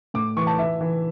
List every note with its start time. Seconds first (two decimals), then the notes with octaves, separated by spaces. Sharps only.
0.14 A2 D6
0.37 E3 C#6
0.47 A5
0.58 E3 E5
0.81 E3